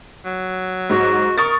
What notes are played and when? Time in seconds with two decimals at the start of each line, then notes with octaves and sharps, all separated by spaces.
0.25 F#3
0.90 G#2 F#4
1.38 A#4 C#6 D#6 A6